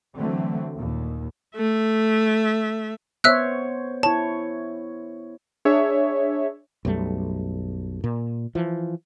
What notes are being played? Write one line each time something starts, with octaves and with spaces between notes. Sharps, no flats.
D3 E3 F#3 A3 C4
D#2 A#2
A3 E5
B3 C5 C#5 E5 E6 F#6
E4 C#5 A5
D4 G#4 C#5 E5
B1 F#2 G3 A3
A#2
E3 F3